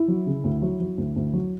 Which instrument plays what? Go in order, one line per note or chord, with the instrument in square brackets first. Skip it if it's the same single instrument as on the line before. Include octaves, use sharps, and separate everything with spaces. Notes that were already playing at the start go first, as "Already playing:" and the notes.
Already playing: [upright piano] E4
F#3
C#3
D2
F#3
F#3
D2
D2
F#3